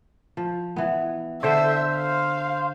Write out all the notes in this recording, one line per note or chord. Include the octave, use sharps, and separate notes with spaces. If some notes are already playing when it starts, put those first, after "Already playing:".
F3
E3 B3
D3 A4 C5 D5 E5
F5